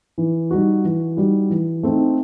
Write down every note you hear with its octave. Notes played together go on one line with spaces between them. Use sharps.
E3
G3 D#4 F#4
E3
G3 D#4 F#4
E3
A3 C4 D#4